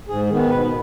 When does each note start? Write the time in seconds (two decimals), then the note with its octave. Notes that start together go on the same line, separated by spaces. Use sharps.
0.09 G#2 G#4
0.30 D#3 B3
0.50 B2 B4